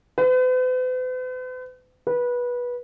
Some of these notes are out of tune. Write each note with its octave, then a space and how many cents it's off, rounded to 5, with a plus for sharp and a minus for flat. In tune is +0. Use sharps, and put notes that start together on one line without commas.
B4 +45
B4 -20